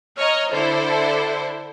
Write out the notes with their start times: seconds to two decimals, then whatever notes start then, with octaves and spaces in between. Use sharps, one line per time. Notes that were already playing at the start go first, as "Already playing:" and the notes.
0.19 C#5 D#5 A#5 F6
0.53 D3 E4 A4 C5